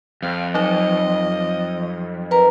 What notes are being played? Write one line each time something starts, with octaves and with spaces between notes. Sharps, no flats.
F2 F5
F#3 D#4 D#5
A#4 B4 A#5